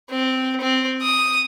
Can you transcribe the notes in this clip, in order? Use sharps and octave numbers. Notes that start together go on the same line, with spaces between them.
C4
C4
D#6